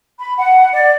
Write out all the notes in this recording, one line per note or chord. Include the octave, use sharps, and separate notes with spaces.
B5
F#5
D5